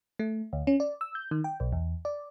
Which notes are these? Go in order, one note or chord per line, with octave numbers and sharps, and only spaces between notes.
A3
D2
C#4
D5
E6
G6
D#3
G5
B1
E2
D5